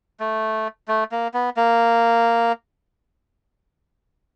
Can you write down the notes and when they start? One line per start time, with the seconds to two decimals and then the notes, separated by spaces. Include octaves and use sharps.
0.20 A3
0.88 A3
1.12 A#3
1.34 B3
1.57 A#3